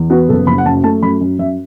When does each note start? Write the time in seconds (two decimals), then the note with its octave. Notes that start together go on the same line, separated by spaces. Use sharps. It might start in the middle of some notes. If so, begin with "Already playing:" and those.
Already playing: E2
0.10 B3 F#4
0.29 F#1 A4
0.47 F#1 B5
0.58 F#5
0.66 F#2 A5
0.84 A3 A5
1.03 F#2 B5
1.21 F#2
1.39 F#2 E5